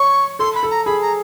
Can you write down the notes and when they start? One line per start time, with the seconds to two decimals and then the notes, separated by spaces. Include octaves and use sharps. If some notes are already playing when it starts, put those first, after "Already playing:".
Already playing: C#5 C#6
0.39 A4 C6
0.55 B5
0.63 A4
0.71 A#5
0.86 G#4 B5
1.02 A#5